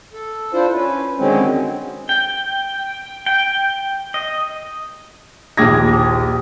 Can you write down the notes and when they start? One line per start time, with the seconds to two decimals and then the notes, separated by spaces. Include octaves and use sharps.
0.13 A4
0.53 D4 E4 F4 C5
0.74 C#4 B4
1.19 D3 D#3 F#3 G#3 C4 C#4
2.09 G5
3.26 G5
4.14 D#5
5.57 A#1 D#2 D6 D#6 G#6 A#6